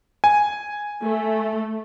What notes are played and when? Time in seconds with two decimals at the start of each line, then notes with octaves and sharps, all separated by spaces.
0.24 G#5
1.02 A3